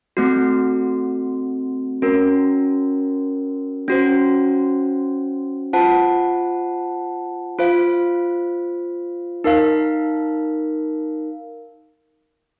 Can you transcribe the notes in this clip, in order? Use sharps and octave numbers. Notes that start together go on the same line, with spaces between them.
A3 C4 F#4
C#4 F#4 A#4
C#4 F#4 C5
F4 C5 F#5 A5
F4 C5 F5
D#4 A#4 F5